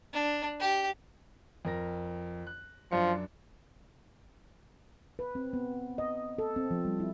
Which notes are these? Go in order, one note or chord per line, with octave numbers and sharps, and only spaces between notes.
D4
G4
F2 A#4 A#6
F#6
F#2 F3 D4 C#7
B4
C4
B3
D#5
A4
C4
F3
G3
E4